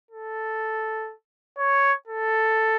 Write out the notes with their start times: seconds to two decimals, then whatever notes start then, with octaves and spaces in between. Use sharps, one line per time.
0.11 A4
1.58 C#5
2.07 A4